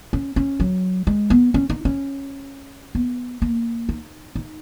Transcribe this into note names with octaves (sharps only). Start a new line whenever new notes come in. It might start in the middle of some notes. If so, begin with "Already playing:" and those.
C#4
C#4
F#3
G#3
B3
C#4
D#4
C#4
B3
A#3
D#4
D#4